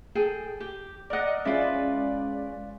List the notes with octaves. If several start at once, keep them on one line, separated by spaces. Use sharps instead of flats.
G#4 A4 G5
G4
A#4 D5 D#5 F#5
G#3 C#4 E4 F4 B4 D5